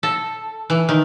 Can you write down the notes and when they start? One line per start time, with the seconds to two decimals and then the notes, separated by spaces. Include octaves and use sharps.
0.03 A4
0.70 E3
0.89 D#3